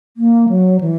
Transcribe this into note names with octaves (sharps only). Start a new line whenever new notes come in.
A#3
F#3
E3